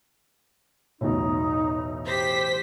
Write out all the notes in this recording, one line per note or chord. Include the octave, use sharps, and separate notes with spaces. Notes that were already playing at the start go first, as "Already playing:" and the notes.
B1 E2 A2 D#4
G4 C5 B6